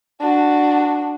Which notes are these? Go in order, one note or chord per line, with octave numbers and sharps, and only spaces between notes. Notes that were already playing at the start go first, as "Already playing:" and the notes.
D4 F#4